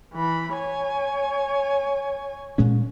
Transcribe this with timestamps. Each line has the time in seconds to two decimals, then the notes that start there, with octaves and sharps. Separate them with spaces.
0.15 E3 B5
0.57 C#5 G#5
2.58 A#2 G#3 C#4